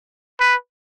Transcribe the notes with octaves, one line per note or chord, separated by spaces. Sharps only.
B4